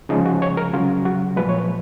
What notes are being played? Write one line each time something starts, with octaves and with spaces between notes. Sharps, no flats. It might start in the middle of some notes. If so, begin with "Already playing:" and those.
C#3 F3 G#3 D#4
F#4
C#5
A#4
C#3 F#3 F4
F#4
A#2 F3 G#3 B4
C#5
B4